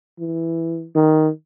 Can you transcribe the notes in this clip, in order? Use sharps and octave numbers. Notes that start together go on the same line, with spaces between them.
E3
D#3